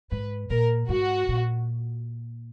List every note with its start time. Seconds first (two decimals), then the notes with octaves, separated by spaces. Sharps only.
0.11 G#2 B4
0.50 A#2 A#4
0.89 G#2 F#4
1.28 A#2